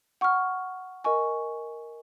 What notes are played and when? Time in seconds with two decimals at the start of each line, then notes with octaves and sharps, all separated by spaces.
0.21 F#5 C#6 F6
1.04 A#4 D#5 G#5 C#6